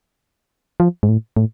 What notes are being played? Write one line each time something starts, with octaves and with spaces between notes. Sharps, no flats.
F3
G#2
A2
A2